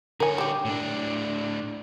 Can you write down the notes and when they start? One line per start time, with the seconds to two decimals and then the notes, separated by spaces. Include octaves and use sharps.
0.20 D3 A#4 C#5 G#5
0.38 G3 G4
0.65 A2 D4